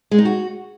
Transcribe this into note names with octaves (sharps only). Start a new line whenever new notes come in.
G#3
D#4
F#4